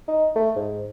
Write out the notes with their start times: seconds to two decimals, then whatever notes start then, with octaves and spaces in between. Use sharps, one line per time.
0.08 D#4
0.36 A3
0.56 G#2